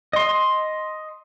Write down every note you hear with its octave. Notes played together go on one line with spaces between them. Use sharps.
D#5 C6